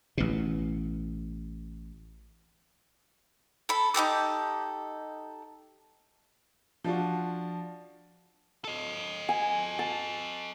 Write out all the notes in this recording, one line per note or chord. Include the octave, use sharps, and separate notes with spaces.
A1 B2
A4 B5
D#4 F#4 G4 A4
F3 D4 F4 F#4
A4 D#5
G#5
A5